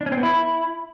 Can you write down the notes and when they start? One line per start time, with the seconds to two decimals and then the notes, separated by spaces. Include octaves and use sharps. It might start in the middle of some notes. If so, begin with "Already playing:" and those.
0.01 D4
0.06 C#4
0.12 C4
0.18 B3
0.23 E4